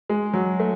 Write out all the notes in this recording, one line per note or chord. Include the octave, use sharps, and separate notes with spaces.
G#3
F#3
A3